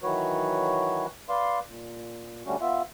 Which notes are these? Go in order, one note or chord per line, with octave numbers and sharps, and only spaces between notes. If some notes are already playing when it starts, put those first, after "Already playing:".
D#3 E3 F#3 F#4 B4 C#5
B4 D5 F5 C6
A#2
D3 G3 A3 C#4 F#4
B3 F4 E5